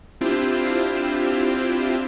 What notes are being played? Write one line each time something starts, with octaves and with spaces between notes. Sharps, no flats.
C4 D4 E4 F4 G4 C5